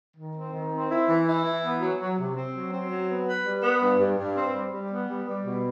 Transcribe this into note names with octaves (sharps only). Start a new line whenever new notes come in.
D#3
C4
D#3
C4
E4
E3
E4
E3
B3
F#3
F#3
C3
C4
F#3
C4
F#3
B3
B4
G3
B3
G2
G2
G2
C4
G3
G3
B3
G3
G3
B2